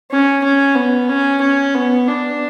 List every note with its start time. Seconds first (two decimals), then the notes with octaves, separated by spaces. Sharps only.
0.11 C#4
0.44 C#4
0.75 B3
1.09 C#4
1.41 C#4
1.74 B3
2.07 D4